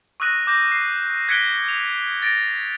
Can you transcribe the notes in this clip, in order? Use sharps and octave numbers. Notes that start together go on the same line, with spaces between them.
C#6 D#6 E6 F#6 A#6 D#7
D6 G6 A#6
C7
F#6 G#6 B6 C#7 D7 G7
F7
A6 A#6 D7